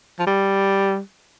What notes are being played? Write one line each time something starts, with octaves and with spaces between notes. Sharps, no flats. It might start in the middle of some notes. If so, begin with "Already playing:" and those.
F3
G3